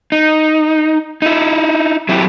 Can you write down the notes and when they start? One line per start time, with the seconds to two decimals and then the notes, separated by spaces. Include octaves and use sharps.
0.12 D#4
1.22 D#4 E4
2.09 F#3 C4 E4 G4